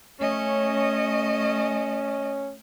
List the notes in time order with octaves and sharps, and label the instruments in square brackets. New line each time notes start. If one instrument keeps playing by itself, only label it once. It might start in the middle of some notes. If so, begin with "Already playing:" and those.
[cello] A3 D#5 [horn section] C#4